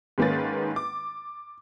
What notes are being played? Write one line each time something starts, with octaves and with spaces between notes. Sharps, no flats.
G#2 D#3 A#3 C#4 B4 A6
D6